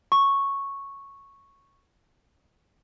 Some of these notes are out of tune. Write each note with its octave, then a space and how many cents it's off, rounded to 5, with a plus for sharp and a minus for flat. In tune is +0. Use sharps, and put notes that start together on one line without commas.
C#6 -5